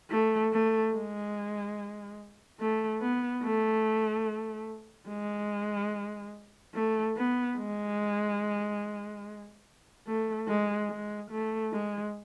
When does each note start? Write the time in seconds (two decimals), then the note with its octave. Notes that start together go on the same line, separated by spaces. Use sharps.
0.10 A3
0.52 A3
0.93 G#3
2.60 A3
3.01 B3
3.43 A3
5.08 G#3
6.74 A3
7.16 B3
7.58 G#3
10.06 A3
10.48 G#3
10.90 G#3
11.31 A3
11.72 G#3